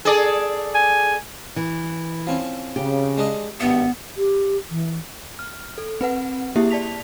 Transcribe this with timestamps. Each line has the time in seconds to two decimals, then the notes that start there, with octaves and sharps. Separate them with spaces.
0.05 G#4 A4 D5
0.75 G#5
1.56 E3
2.27 F3 C4 C#4
2.76 C#3 G4
3.17 G#3 D4 D#5
3.60 G#1 G2 B3 E5
4.17 G4
4.70 E3
5.39 F6
5.78 A4
6.01 C4 B4 F#5
6.56 A#3 E4 G4 G#4 E5
6.70 D5 A5 B6 F7